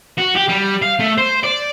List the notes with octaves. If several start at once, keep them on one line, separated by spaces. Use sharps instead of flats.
F#4
G4
G3
F5
A3
C5
D5